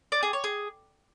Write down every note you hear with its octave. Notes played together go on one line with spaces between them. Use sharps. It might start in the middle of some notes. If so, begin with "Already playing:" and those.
D5
G#4
C#5
G#4